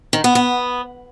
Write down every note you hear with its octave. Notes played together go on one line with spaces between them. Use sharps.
D#3
B3
B3